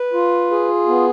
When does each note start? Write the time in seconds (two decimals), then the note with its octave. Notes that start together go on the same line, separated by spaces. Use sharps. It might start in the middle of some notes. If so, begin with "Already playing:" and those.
Already playing: B4
0.13 F4
0.51 G#4
0.88 B3